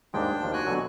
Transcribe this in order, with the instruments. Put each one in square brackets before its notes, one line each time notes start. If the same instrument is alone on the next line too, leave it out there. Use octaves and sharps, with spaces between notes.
[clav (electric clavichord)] D#2 G#2 G#3 [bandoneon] D4 G5
[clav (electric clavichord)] D#2 F3 A5
[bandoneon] F#4 G#5 F#6
[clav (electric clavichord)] B2 D3 F#3